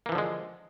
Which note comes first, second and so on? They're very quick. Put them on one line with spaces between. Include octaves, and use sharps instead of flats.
A#3 E3 F3 D3 G#3